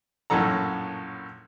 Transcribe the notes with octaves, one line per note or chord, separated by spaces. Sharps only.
A#1 F#2 A2 F#3 A4 A#5